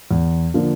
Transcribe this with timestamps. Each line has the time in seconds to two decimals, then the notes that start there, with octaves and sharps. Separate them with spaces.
0.11 E2
0.54 D3 F3 A#3